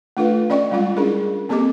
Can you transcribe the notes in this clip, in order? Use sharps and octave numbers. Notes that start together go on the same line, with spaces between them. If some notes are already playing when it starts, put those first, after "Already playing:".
A3 D4 F4 A4 B4 F5
C#4 D5 D#5 G5 C#6
G3 G#3 C#4 F4 D#5
C#4 D4 E4 G#4 A#4
A#3 C4 G4 A4 D#5 D6